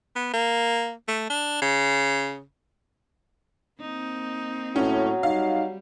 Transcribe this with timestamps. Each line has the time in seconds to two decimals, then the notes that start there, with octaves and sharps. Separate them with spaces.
0.16 B3
0.34 A#3
1.08 A3
1.30 D4
1.62 C#3
3.81 A#3 C4 D#4
4.76 A2 F#3 C#4
5.23 G3 D#4 F5